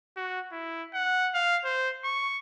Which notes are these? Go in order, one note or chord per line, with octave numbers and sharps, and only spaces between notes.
F#4
E4
F#5
F5
C5
C#6